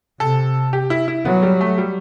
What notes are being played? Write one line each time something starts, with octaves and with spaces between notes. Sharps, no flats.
C3 A4
G4
E4
E4
F#3 B3
G3
A3
G3